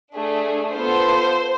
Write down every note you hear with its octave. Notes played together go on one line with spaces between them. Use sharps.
A3 D4 G#4
B3 F4 A4 C5